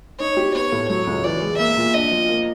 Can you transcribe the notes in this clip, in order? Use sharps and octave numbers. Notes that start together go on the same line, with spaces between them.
D#4 C#5
G4
B3 C#5
A2
F#3 C#5
C#2
E3 D5
G#3
A#3 E5
A#2
D4 D#5
F3
A#3